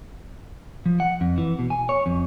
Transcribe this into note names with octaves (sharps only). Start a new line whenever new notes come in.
F3
F#5
F2
E3
B2
G#5
C#5
F2